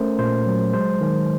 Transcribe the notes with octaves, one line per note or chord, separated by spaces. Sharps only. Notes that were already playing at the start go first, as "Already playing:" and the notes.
Already playing: A3 C#4 A#4 C5
A#2 C5
F#3
G#3 C5
D#3